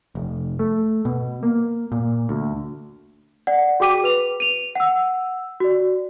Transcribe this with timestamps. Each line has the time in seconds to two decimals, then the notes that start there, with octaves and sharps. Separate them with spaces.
0.15 F1
0.59 A3
1.05 B2
1.43 A#3
1.92 A#2
2.29 D2
3.47 D5 F#5
3.80 F#4 G#4 G5 D6 B6 D#7
4.04 B4 F7
4.40 D#7 F7
4.76 F#5 E6
5.60 F#4 D5